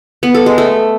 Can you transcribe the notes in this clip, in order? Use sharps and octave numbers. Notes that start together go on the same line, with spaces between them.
B3
A4
G#3
A3